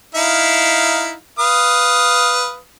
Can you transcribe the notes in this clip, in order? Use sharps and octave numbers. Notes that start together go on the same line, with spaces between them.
D#4 E4 F5
B4 F5 D#6